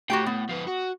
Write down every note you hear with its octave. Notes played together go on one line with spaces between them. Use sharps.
A2 F#4 G4 G5
B3
F3 B4
F#4